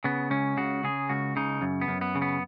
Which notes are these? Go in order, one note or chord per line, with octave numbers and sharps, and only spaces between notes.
C#3 B3
C#2 C#4
C#3 F#4
C#3 G#4
C#2 F#4
C#3 D#4
F#2
B3
F#2
B3
C#3
B3